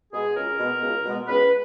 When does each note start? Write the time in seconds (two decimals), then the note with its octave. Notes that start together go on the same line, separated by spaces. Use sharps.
0.13 B2 G#3 B3 G#4
0.36 C#2 A#4
0.60 B2 G#3 B3
0.82 C#2
1.05 B2 G#3 B3
1.28 C#2 B4